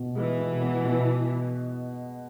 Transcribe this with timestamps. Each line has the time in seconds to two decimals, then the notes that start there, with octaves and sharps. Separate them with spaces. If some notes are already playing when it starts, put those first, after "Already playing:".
Already playing: B2 B3
0.15 E3 G#3
0.39 B2
0.61 B3
0.84 B2